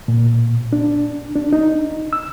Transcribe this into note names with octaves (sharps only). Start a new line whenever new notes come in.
A#2
D4
D4
D#4
E6